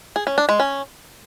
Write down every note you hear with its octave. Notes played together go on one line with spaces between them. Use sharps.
G#4
C#4
D4
G#3
C#4